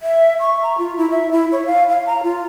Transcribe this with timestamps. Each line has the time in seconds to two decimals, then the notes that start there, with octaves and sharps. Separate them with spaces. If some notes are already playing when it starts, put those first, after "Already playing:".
0.02 E5
0.40 C#6
0.63 A#5
0.78 F4
0.97 E4
1.10 E5
1.31 E4
1.52 C#5
1.66 F5
1.89 F5
2.06 A#5
2.23 F4